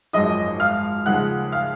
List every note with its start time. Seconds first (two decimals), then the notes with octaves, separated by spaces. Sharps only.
0.13 G#1 F#2 F3 G#3 D#5 D#6
0.60 F5 F6
1.06 D#2 C#3 F3 G#3 F#5 F#6
1.52 F5 F6